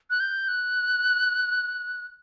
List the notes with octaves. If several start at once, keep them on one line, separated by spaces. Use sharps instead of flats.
F#6
G6
F#6